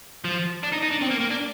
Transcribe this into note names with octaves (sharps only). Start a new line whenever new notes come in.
F3
D4
D#4
D#4
D4
C4
A#3
A#3
D4